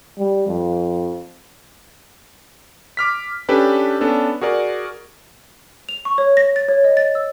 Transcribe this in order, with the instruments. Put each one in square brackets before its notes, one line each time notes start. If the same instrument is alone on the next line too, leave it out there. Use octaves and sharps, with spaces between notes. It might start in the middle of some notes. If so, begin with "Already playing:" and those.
[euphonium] G3
F2
[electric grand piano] D6 F6 B6
C#4 D4 G4 A4 B4
B3 C#4 D4 A4
F#4 G#4 A#4 D5
[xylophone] F7
C#6
C#5
A#6
A6
C#5
D#5
A6
E6